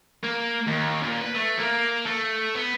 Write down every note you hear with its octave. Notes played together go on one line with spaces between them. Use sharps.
A#3
D#2
A#2
B4
A3
A#3
A3
B3